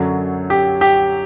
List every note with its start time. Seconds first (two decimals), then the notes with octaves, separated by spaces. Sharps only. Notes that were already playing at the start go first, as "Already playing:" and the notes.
Already playing: F#2 D3 F#3
0.50 G4
0.81 G4